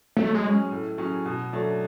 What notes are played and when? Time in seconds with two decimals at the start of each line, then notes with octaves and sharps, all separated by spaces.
0.17 F#3 A3
0.34 G#3
0.44 C#4 G#4
0.71 A2
0.98 F#3 C#4 G#4
1.26 B2
1.53 F#3 A3 D4